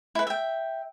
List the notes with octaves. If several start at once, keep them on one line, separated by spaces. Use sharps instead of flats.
E4 B4
E5 G5